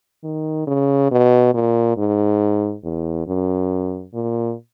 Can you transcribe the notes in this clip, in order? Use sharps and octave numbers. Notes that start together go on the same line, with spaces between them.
D#3
C#3
B2
A#2
G#2
E2
F#2
A#2